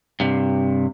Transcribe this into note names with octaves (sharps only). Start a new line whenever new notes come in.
G2 C3